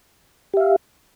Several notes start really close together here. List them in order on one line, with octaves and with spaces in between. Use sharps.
G4 E5 F5